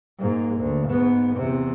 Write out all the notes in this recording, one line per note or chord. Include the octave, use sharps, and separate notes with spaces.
G#2 A#3
D2
G#2 B3
E2 C3